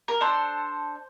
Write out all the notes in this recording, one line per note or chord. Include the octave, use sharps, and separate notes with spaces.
A#4
D4 A4 C5